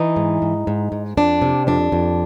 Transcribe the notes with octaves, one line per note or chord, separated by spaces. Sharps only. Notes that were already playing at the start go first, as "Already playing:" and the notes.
Already playing: E3 D#4
G#2
G#2
G#2
G#2
F2 D4
C3
F2 D4
F2